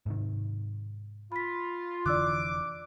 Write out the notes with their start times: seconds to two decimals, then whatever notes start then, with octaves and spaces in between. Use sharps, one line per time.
0.06 G#2 C3 D#3
1.32 F4 B5 B6
2.06 F1 D3 E3 D5 D6 E6 F#6